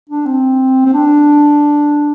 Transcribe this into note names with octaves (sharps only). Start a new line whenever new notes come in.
D4
C4
C4
D4